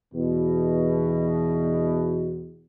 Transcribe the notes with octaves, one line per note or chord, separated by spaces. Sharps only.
E2 B2